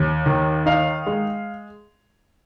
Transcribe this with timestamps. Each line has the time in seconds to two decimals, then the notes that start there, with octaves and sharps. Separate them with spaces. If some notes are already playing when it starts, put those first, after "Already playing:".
Already playing: D#2
0.26 D#3
0.66 D#4 F5
1.07 G#3